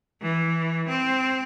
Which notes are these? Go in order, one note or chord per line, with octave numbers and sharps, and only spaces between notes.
E3
C4